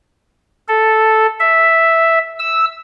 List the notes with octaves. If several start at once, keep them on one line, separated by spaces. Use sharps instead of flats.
A4
E5
E6